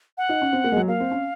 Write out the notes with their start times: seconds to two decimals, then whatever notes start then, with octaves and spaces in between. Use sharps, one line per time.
0.18 F#5
0.29 D#4
0.42 C#4
0.53 C4
0.64 A#3
0.72 G#3
0.77 F#3
0.88 A#3 F5
1.00 C4
1.11 C#4